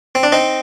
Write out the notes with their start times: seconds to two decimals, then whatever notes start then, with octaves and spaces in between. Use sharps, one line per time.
0.15 C4
0.23 D4
0.32 C4 D#4